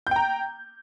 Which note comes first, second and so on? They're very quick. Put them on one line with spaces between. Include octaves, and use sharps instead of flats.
G6 G5 A#5